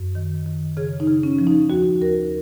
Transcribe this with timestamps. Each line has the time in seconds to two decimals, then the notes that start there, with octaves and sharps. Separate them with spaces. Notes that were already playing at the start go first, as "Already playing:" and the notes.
Already playing: F#2
0.15 D#3
0.46 D#3
0.77 C#3 G#4
1.00 D#4
1.08 C#3
1.23 C#4
1.39 F3
1.47 D#4
1.70 D#2 F#4
2.01 D#2 A#4